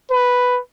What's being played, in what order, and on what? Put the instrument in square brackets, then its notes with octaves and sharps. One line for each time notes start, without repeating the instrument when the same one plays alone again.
[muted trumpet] B4